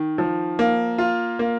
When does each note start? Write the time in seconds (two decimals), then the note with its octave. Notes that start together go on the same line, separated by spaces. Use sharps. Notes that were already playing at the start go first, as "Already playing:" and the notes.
Already playing: D#3
0.18 F3
0.59 A#3
0.98 F4
1.39 A#3